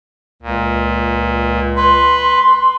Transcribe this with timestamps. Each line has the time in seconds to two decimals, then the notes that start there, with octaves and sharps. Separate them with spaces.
0.43 C#2 A#2
1.77 B4 C6